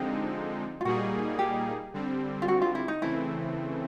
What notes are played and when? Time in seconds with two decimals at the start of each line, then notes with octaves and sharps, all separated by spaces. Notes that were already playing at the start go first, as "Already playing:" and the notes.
Already playing: D3 F3 G#3 C4 D#4 G4
0.81 F4
0.85 A#2 G3 A#3 D#4 F#4 G#4
1.39 G4
1.94 D3 G3 C4
2.42 F4
2.48 F#4
2.62 F4
2.75 E4
2.88 D#4
3.02 C#3 E3 A3 C4 E4